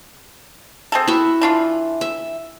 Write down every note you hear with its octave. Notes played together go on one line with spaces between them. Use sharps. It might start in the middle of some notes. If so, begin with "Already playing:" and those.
C4 G#4 A4
E4 F#4 E5
E3 D4 F4
E5